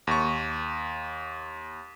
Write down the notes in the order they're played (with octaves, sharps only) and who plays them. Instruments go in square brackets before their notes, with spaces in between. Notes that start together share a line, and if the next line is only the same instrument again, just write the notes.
[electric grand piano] D#2 C#6